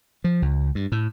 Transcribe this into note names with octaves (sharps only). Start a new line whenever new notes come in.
F3
C#2
G2
A2